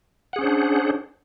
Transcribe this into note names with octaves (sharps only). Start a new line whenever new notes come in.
C#4 D4 G#4 C5 F#5